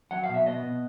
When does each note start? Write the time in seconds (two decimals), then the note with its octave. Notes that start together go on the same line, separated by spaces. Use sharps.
0.11 F#3 F#5
0.24 F5
0.29 B2
0.34 E5
0.46 B3 D#5
0.65 B2